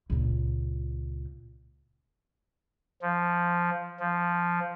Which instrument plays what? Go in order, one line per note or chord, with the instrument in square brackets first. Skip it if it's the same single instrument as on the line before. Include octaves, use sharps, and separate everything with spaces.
[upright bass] C#2 A#2
[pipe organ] F3
F3